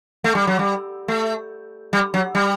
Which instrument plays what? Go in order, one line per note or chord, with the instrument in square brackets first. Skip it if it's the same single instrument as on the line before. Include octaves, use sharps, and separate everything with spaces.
[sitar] A3
G3
F#3
G3
A3
G3
F#3
G3